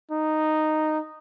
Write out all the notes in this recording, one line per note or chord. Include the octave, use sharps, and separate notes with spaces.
D#4